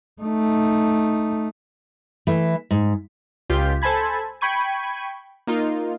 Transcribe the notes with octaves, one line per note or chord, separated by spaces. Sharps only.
A3 D#4
E3 A3
G#2
C#2 F4 G4 G6 B6
A4 C5 G#5 A5 B5 G#6
G5 B5 C#6 G#6 D#7
A#3 D#4 F4